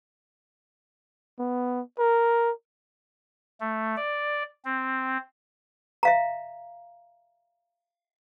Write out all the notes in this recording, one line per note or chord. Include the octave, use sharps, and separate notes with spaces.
B3
A#4
A3
D5
C4
E5 F5 A#5